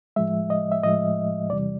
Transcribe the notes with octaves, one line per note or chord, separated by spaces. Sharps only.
A2 F3 G#3 E5
D#5
E5
A2 F3 G#3 D#5
E2 C3 E3 G3 D5